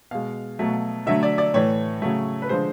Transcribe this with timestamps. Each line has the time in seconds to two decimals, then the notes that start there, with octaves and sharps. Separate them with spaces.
0.11 B2 G#3 F5
0.59 B2 F#3 A3
1.07 D3 F#3 A3 E5
1.23 D5
1.38 D5
1.54 A2 E3 A3 C#5
2.02 C#3 F#3 A3
2.42 B4
2.49 D3 F3 G#3 C5